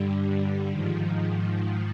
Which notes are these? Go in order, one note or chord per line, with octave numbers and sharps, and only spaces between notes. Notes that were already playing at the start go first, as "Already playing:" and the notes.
Already playing: G2 D3 G3
G#2 D#3 F3